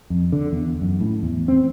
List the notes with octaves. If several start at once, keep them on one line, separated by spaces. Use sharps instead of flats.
F2
D3
E2
F#2
A2
E2
C4